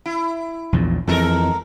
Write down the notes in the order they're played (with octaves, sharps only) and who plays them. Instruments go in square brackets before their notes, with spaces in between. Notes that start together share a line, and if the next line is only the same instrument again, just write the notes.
[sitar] E4
[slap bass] A#1 E2 A#2
[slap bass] F2 E3 [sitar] G#3 A4 A#4